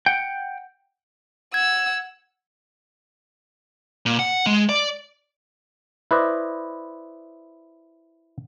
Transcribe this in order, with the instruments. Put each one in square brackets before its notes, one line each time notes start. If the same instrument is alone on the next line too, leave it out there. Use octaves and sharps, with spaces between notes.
[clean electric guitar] F#5 G5
[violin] F#5 E6 [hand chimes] G#6
[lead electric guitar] A#2
F#5
G#3
D5
[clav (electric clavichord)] E4 B4 C5 D5 D#5